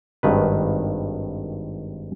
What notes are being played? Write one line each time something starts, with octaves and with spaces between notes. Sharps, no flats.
G#1 G2 D#3 B4